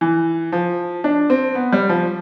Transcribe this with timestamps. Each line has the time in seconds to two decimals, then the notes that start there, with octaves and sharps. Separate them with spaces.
0.01 E3
0.52 F3
1.04 D4
1.30 C4
1.55 B3
1.73 G3
1.89 F3